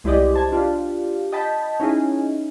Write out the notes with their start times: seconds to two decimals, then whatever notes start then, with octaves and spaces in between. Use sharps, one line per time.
0.04 C2 G#3 E4 G4 D5 D#5
0.34 C5 A5 G#6
0.52 D4 F4 G4
1.32 D#5 G5 A5 B5
1.80 C#4 D#4 E4 G#4